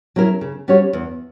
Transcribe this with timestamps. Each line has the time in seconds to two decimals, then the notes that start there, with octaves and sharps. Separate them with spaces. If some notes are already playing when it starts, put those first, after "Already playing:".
0.16 F#3 C#4 E4 A#4
0.41 C#3
0.68 G3 C#4 F#4 C#5
0.93 E2